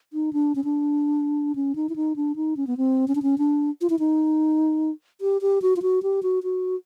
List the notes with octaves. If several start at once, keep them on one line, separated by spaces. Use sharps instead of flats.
D#4
D4
C#4
D4
C#4
D#4
E4
D#4
D4
D#4
C#4
B3
C4
C#4
D4
C#4
D4
F4
E4
D#4
G4
G4
F#4
F4
F#4
G4
F#4
F#4